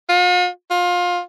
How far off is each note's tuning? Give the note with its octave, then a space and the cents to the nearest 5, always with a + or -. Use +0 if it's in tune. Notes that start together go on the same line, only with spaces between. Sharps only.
F4 +45
F4 +25